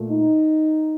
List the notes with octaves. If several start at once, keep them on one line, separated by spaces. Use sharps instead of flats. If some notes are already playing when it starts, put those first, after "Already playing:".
Already playing: A#2 A3
D#4